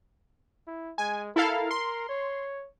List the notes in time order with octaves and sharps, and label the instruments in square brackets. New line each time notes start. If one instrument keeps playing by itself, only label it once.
[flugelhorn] E4
[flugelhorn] G#3 [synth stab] G#5
[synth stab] E4 A4 F5 [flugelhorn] A#4
[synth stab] C6
[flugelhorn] C#5